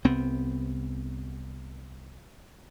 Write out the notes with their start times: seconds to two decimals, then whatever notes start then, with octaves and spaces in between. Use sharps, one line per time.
0.05 C2 B3 C4